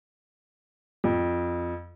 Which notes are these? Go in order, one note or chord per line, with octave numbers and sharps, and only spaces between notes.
F2